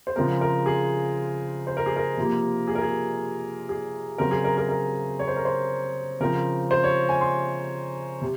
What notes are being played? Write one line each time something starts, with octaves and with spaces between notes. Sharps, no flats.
C5
C#3 F3 G#3 C4 A#4
A#4
G#4
C5
A#4
G#4
A#4
C3 F3 A#3
G#4
A#4
G#4
G#4
C#3 F#3 C4 A#4
G#4
A#4
A#4
A#4
C#5
C5
A#4
C5
C#3 F3 C4 A#4
C5
C#5
G#5
C6
C3